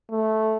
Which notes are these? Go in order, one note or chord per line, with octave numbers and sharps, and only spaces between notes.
A3